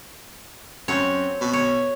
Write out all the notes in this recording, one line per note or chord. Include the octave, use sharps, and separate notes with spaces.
F#2 C4 C#5
B2
C#5